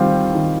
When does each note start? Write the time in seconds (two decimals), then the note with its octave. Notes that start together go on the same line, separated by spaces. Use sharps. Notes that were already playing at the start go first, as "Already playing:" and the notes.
Already playing: D#3 G3 C4 F4
0.34 D#3